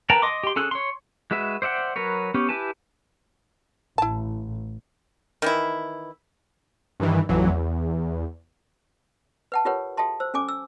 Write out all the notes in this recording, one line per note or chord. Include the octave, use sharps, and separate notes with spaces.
A#4 B4 G5 A5 A#5
D#5 C6 D6
G4 C6
C#4 G#4 A4 E6 F#6
C#5 C6
G#3 F#4 B4 E5
C5 D5 E5 F#5 G5
F#3 A#4 B4 C#5
B3 C#4 G4 C#5
E4 G4 B4 G#5 A5
A1 E4 A5
D#3 E3 E4
G2 D#3 E3
A1 F2 E3 F#3
E2
B4 F#5 A5
F4 G4 A#4 B4 C#5 F#5
F#4 A4 E5 G5 A5 C6
C5 E6
C#4 A4 G#5 D6
E6